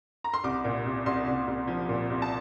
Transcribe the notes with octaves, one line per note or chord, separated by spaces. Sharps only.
A#5
C6
C2 D6
A#2
C2
C2 C6
C2
C2
F3
A#2
C2
A5